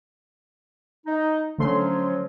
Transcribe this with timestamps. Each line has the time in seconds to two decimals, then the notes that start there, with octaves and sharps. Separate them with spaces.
1.07 D#4
1.58 D3 F3 F#3 A3 C#4 C6